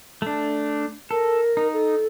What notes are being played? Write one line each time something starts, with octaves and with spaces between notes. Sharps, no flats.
A3 D4
A4 A#4
D#4
A4